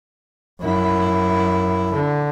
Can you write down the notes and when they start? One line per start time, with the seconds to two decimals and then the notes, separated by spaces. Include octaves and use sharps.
0.61 F#2 E4
1.93 D3